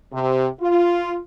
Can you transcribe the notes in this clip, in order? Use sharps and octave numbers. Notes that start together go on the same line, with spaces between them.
C3
F4